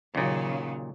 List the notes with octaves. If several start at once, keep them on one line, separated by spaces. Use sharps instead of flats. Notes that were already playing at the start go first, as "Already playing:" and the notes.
D#2 A#2 C#3 F#3